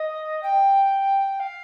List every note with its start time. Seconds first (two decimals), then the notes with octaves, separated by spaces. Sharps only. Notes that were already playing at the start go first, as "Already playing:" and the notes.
Already playing: D#5
0.43 G5
1.40 F5